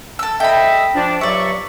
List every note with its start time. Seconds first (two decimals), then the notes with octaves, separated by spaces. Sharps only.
0.19 A4 E6
0.40 A4 D#5 E5 G5 B5
0.95 F3 D4
1.21 G2 F#3 D5 E5 C#6